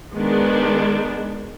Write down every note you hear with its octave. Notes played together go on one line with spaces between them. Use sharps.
D#3 G#3 B3 D4